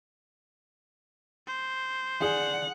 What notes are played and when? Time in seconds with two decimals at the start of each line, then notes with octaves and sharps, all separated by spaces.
1.47 C5
2.22 G#4 D5 F#5